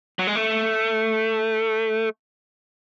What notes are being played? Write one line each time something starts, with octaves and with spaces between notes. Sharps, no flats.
F#3
G#3
A3